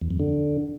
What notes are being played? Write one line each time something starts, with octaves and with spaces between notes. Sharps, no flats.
E2
F2
D3